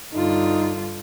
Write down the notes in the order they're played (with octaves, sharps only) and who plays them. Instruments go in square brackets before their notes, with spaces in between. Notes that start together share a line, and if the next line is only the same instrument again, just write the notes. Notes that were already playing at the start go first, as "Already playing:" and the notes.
[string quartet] G2 D3 F4 [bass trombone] D#4